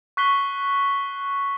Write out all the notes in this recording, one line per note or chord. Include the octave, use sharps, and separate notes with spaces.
C#6 F#6 B6 C7 G7